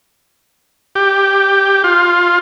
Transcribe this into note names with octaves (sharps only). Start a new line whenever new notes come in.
G4
F4